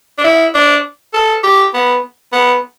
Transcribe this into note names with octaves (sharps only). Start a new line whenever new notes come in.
D4
E4
D4
A4
G4
B3
B3